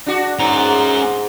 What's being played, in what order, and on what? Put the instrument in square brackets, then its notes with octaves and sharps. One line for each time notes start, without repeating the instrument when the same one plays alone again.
[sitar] D4 F#4
[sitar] G#2 [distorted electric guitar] C#4 A#5